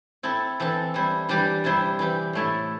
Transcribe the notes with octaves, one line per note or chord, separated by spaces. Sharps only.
C4 E4 A4
E3 C4 A4
G3 E4 C5
E3 G3 D4 G4 D5
C3 G3 E4 C5 E5
E3 C4 G4
A2 A3 E4 A4